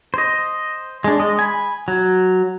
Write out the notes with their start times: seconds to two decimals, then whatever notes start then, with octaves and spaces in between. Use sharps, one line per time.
0.14 C5 D#5
1.04 G#3 D4
1.20 G#3 D#5
1.39 G#5 B5
1.88 F#3